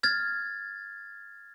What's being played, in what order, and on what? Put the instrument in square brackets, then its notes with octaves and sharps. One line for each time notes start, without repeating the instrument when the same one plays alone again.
[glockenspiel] F6 G#6 A6